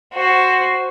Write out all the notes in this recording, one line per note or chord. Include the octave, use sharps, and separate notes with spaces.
F#4 C5